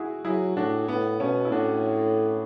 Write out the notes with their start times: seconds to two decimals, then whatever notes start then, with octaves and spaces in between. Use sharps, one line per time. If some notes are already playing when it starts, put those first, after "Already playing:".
Already playing: E4 F#4 G#4
0.25 F#3 E4 G#4
0.57 A2 D4 F#4
0.88 A2 B3
1.20 B2 A3 C#4
1.45 E4
1.52 A2 D4 F#4